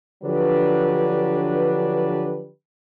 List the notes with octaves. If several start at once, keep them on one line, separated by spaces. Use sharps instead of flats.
D3 F3 F#3 D4 G4 B4